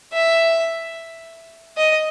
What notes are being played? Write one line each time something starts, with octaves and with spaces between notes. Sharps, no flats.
E5
D#5